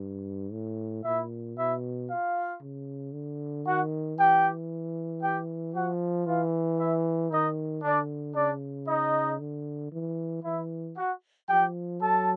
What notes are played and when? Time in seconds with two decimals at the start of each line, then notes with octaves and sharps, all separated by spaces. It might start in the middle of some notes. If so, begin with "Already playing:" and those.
Already playing: G2
0.52 A2
1.04 A#2 E4 E5
1.56 B2 E4 E5
2.08 F4 F5
2.61 C#3
3.13 D3
3.66 D#3 F#4 F#5
4.18 E3 G4 G5
5.21 G4 G5
5.74 F3 F#4 F#5
6.26 E3 F4 F5
6.78 E4 E5
7.31 D#3 D#4 D#5
7.82 D3 D4 D5
8.35 C#3 D4 D5
8.87 D#4 D#5
9.39 D3
9.92 E3
10.44 E3 E4 E5
10.96 F#4 F#5
11.48 F3 G4 G5
12.00 F#3 A4 A5